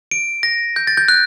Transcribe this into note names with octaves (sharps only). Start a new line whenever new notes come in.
D7
A#6
G6
A6
G6
F#6